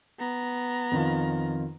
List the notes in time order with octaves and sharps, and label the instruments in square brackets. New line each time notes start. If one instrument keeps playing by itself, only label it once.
[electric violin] B3 A#5
[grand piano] F2 D#3 F4